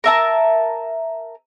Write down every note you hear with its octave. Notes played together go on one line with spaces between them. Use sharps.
A#4 E5 A5